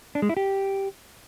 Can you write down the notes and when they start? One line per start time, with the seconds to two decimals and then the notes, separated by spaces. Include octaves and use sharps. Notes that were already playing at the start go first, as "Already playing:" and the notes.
0.15 D4
0.22 G#3
0.29 E4
0.37 G4